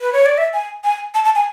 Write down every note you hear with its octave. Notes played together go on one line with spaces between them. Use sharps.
B4
C#5
D5
E5
G#5
G#5
A5
A5
G#5